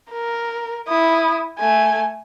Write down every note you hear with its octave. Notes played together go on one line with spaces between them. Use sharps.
A#4
E4 D#6
A3 G#5